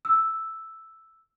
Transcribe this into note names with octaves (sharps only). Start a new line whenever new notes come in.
E6